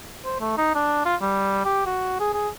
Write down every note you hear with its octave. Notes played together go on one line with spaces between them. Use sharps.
C5
A3
D#4
D4
F4
G3
G4
F#4
G#4
G#4